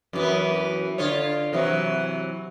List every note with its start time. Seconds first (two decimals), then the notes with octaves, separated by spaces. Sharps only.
0.13 F#2 E3 B3
0.98 D3 F4 C#5
1.53 C3 E3 F#3